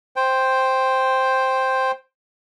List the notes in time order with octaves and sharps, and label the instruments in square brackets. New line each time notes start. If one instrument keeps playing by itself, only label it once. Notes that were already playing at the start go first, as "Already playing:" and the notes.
[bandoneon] C5 G5